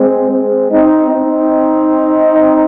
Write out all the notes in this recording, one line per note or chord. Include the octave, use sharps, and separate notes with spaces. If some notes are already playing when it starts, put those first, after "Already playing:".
Already playing: G#3 C4
G#3 C4
C4 D#4
C4 D#4